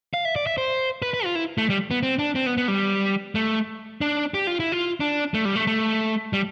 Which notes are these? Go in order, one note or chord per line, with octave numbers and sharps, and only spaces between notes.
F5
E5
D5
E5
C5
B4
B4
F4
E4
A3
G3
B3
C4
D4
C4
B3
B3
G3
A3
D4
G4
F4
E4
F4
D4
A3
G3
A3
A3
G3